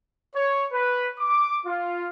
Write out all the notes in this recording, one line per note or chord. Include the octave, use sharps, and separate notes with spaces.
C#5
B4
D6
F4